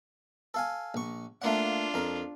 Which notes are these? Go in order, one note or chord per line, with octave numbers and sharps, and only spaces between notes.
A4 F5 G#5
A#1 C#6
A3 A#3 D4 F4 F#5
F2 A#4